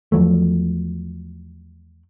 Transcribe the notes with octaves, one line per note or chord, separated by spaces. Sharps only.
E2 F3 F#3 A3